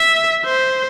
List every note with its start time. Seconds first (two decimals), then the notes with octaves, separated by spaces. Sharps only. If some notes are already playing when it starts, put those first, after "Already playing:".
Already playing: E5
0.45 C5